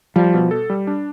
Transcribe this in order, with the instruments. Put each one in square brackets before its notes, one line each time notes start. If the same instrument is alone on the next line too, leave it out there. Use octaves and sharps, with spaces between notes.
[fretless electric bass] F3 [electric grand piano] G3
[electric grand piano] B2
A4
G3
D4